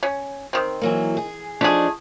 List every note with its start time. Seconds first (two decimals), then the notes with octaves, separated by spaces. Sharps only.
0.03 C#4
0.53 D#3 C4
0.81 E3 F#3 A#3
1.17 G#4
1.61 F3 A3 D4 D#4 G#4